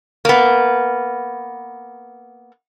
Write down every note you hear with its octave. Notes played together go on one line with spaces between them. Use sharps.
A#3 B3